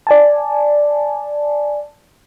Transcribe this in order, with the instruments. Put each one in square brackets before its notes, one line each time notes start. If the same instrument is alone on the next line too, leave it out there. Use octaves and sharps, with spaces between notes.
[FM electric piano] D5 G#5 A5